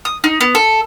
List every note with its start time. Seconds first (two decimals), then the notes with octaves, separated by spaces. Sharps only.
0.05 D#6
0.24 D#4
0.41 B3
0.55 A4